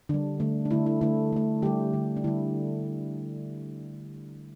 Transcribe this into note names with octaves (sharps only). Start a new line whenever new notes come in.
D3 G3 D4
D3 A3
D4
D3 A3 E4
E4
D3 A3 E4
D3 A3
D3 G3 G4
D3 G3
D4
D3 G3 E4